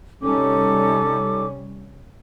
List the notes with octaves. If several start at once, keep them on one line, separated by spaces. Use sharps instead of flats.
C3 G3 C#4 D#4 A4 D6